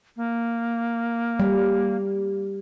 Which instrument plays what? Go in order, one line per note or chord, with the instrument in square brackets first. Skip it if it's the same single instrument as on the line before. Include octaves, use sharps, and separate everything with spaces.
[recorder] A#3
[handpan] G3